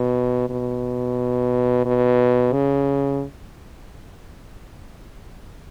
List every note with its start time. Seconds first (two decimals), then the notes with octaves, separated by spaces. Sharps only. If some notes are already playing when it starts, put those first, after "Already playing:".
Already playing: B2
0.50 B2
1.85 B2
2.53 C#3